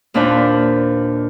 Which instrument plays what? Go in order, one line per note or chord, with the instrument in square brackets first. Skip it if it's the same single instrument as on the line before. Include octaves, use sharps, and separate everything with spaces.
[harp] D#2 A#2 D4 B4 C5